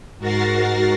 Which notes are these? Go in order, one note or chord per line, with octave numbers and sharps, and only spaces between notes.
G#2 F#4 A#4 A6 A#6 C7